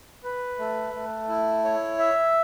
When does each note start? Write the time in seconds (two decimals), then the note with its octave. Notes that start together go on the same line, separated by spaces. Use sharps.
0.24 B4
0.59 A3
0.94 A3
1.28 E4
1.65 C#5
1.99 E5